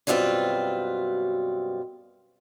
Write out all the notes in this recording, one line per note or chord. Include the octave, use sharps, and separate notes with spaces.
F#2 B2 G3 C4 F4 B4